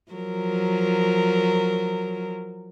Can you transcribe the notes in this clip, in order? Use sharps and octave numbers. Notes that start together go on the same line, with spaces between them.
F3 F#3 A#4